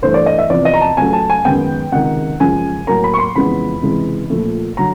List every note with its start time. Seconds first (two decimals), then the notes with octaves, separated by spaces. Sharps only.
0.02 G2 E3 A3 C5
0.14 D5
0.26 D#5
0.38 E5
0.50 E2 C3 F3 D5
0.65 D#5
0.74 A#5
0.81 A5
0.97 C#2 C#3 F#3 A3 G#5
1.13 A5
1.30 G#5
1.45 F#2 D#3 G#3 B3 G5
1.92 C#2 C3 D#3 G#3 F#5
2.40 F#2 C#3 F3 G#3 G#5
2.87 A2 F#3 A#3 A#5
3.04 B5
3.14 C#6
3.19 C6
3.36 F2 C#3 E3 G#3 B3 B5
3.82 C#2 C3 E3 G#3
4.30 A#2 F3 A3
4.77 D3 F#3 A#5